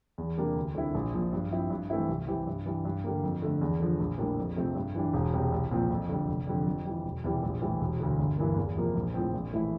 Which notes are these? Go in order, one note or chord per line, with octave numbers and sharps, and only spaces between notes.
E2
C3 G3 A#3 D4
D2
D3 G3 C4 E4
A#1
A#2 F3
G2
F3 C4 E4
G2
E3 A3 C4 E4
C2
C3 E3 G3 C4
G2
E3 G3 D4
G2
D3 G3 A#3
F2
D3 A3
E2
D3 F3
A#1
A2 G3 A#3 D4
F2
C3 F3 A3 C4
G2
E3 G3 D4
E1
E2 C3 G3 C4
C2
A#2 F3 C4
F2
D3 G3
F1
F2 D3 G3
F2
E3 G3
E1
E2 C3 E3 G3
A#1
A2 E3 G3
E1
D2 D3
G1
G2 E3 A#3
E2
C3 F3 A#3
A#1
A2 F3 C4
A#1
A2 E3 A3 E4